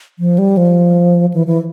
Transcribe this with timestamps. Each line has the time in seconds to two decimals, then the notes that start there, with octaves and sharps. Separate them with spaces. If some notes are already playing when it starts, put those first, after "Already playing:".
0.19 F3
0.38 G3
0.57 F3
1.34 E3
1.47 E3